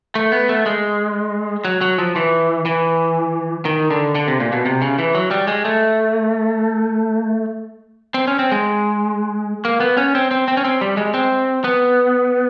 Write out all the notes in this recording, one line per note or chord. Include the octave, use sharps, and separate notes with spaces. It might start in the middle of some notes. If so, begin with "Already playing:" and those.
A3
B3
A3
G#3
F#3
F#3
F3
E3
E3
D#3
D3
D3
C3
A#2
B2
C3
C#3
E3
F#3
G3
G#3
A3
C4
C#4
C4
G#3
A#3
B3
C#4
C4
C4
C4
C#4
C4
G3
G#3
C4
B3